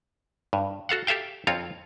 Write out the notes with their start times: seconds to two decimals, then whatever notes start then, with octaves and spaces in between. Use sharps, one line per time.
0.53 G2
0.89 F#4 A4 F5 F#5
1.07 G4 A4 E5 F5 G5
1.47 F2 C4 F4 C#5 F5